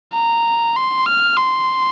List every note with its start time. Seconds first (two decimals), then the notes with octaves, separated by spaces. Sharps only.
0.13 A#5
0.76 C6
1.06 F6
1.37 C6